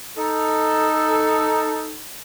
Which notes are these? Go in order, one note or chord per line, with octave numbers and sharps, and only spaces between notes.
D#4 A4